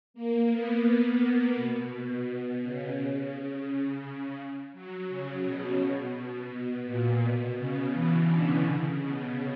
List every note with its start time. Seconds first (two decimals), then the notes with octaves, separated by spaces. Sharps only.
0.14 A#3
0.50 B3
0.85 A#3
1.20 A#3
1.56 B2
1.90 B2
2.26 B2
2.62 C#3
2.97 C#3
4.73 F#3
5.09 C#3
5.45 B2
5.80 B2
6.49 B2
6.85 A#2
7.21 B2
7.56 C#3
7.92 E3
8.26 D3
8.62 C#3
8.97 B2